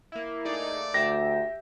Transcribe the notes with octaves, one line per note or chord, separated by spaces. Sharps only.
A#3 E4
A3 A#3 D#4 G#4 D5
D2 G4 E5 A#6